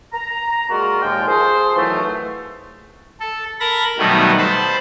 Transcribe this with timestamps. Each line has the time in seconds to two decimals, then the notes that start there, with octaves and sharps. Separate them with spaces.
0.13 A#5
0.70 G#3 A#3 F4 F#4 A#4 D5
1.02 D#2 A#2 F3 G#3 F4 G5
1.28 F4 G#4 A4 C5
1.76 D#3 E3 F#3 A3
3.20 A4
3.60 A#4 A5 B5 A#6
3.99 B2 D#3 F#3 G3 A3 B3
4.38 C5 A5 B5